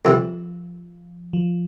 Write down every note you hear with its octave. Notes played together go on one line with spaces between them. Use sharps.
F2 C3 E3 F3 G3
F3